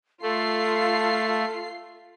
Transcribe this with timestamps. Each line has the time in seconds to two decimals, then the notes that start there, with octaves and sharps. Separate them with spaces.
0.23 A3 F4 A4 C7